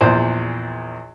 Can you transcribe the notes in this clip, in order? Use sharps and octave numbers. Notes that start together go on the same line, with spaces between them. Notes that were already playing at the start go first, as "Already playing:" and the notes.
A#1 E2 A#2 C5